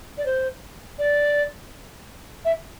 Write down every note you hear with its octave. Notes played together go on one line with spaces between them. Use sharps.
D5
C5
D5
E5